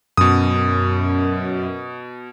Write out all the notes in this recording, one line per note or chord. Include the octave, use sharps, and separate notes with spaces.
F#2 B2 D#6